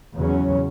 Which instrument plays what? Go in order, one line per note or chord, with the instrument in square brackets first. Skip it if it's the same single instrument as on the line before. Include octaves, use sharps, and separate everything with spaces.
[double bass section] E2 C#3 F#3 C#4